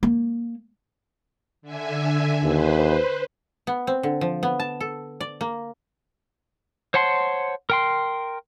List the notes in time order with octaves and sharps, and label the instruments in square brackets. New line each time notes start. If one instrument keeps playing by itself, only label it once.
[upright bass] A#3
[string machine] D3 E5 G#5
[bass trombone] D#2 [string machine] B4 C5
[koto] B3
C4
D3
F3
B3
A5
A4
D5
A#3
[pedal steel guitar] C5 C#5 F#5 A5 C6
A#4 G5 C6